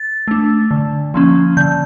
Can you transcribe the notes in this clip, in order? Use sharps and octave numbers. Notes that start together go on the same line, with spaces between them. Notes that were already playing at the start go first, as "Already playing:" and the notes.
Already playing: A6
A3 D4
D3
F3 A#3 C#4
D3 G6